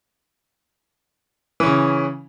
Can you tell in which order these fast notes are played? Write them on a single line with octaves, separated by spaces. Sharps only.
E3 C#4 C#3